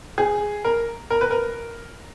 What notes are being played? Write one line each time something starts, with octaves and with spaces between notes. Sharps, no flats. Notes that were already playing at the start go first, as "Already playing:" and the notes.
G#4
A#4
A#4
B4
A#4